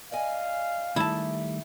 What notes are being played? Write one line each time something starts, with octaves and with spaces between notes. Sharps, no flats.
D5 D#5 F5 G#5
D#3 G3 A3 E4 G4 A5